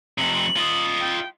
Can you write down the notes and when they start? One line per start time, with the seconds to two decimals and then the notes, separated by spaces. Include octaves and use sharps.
0.18 F2 C3 F#7
0.56 F4 D#5
1.00 G5